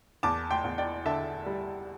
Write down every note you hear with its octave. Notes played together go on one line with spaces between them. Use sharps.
E2 A5 D6
G5 C6
E2
D5 G5
D3 E5 A5
G3